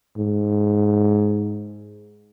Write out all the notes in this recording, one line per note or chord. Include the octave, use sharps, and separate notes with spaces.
G#2